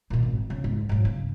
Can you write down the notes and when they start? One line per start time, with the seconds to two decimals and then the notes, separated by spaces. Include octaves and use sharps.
0.10 A#2 D#3
0.23 G#1
0.50 C#3
0.64 G#2
0.89 G#2 F#3
1.05 C#3